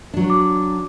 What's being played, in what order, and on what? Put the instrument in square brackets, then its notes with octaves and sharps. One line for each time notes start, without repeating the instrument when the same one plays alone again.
[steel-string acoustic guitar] F#3 D4
[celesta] D6